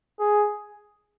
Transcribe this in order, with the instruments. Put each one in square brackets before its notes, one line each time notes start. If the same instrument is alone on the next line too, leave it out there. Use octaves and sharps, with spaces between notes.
[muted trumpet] G#4